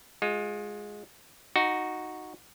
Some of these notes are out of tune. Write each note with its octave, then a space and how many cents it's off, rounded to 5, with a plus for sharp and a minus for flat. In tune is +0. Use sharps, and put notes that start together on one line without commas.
G#3 +0 F4 +30
D#4 +0 F#4 +0